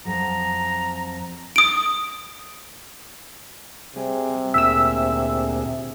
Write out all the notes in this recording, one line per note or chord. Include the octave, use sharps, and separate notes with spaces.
F2 F#3 A#5
D#6 D7
C3 G3 G#4
D2 A#2 G#4 E5 E6